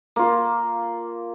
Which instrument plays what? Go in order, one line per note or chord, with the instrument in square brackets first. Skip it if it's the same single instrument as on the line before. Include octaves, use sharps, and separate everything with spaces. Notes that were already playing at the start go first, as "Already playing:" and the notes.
[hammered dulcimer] A#3 F4